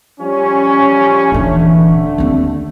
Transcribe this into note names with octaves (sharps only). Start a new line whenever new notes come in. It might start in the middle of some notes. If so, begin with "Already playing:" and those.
F3 G3 C#4
D#1 D3 E3 A3
D#2 C4